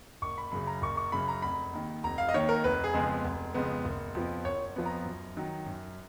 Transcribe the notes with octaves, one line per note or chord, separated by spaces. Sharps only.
F#1 C#6
B5
F#2 C#3 B5
A#5
F#1 C#6
C#6
F#2 C#3 B5
A#5
F1 B5
D#2 D#3
F1 A#5
F5
D#5
D#2 D#3 C#5
A#4
F1 B4
G#4
F2 C#3 G#3 B3
F1
F2 C#3 G#3 B3
F#1
F2 F3 B3
F#1 C#5
F2 F3 B3
A#5
F#2
D#3 F#3
F#2